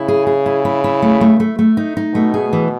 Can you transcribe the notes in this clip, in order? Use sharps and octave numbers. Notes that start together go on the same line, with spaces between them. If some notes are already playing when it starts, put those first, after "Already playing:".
Already playing: C#3 E4
G#4
G#4
E4
E4
E4
A3
A3
A3
A3
D#4
D#4
B2 A3
G#4
E3